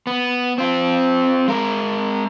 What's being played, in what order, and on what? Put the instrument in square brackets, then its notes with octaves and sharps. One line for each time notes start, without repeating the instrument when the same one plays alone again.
[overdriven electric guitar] B3
C4 F4
G#3 A#4